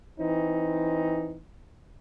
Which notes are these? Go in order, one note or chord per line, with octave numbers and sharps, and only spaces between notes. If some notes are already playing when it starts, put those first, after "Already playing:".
E3 C4 D#4